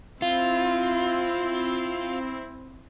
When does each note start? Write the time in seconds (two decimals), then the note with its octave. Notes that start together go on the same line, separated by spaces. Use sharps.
0.22 C4 E4 F4